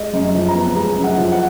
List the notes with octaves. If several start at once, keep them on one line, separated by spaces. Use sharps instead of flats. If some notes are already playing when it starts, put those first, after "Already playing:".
Already playing: G#3 D#5
F#2
D#5
F3
A#5
B3
G#3 A#5
F#2
F#5
F3
F#5